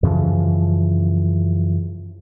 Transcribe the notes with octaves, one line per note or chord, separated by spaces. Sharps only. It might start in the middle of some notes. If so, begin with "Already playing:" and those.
F#2 C#3 E3 F3